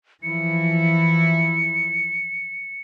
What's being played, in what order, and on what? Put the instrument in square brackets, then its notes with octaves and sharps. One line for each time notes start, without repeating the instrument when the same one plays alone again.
[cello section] E3 F3 E4 [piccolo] C#7